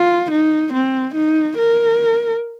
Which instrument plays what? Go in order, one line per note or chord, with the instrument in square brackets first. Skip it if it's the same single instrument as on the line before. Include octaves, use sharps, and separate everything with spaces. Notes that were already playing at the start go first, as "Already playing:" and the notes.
Already playing: [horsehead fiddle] F4
D#4
C4
D#4
A#4